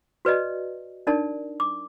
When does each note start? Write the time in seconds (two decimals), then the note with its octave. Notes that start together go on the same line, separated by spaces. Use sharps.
0.25 F#4 B4 D5 D#5
1.07 D4 D#4 A#4 D5 A5
1.60 D6